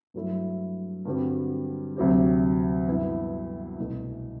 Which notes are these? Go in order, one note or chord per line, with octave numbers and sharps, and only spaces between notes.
G2 F#3 A3 E4
G2 D3 G3 C4 F#4
D2 C3 F#3 C4 G4
G2 E3 B3 E4
C2 B2 A3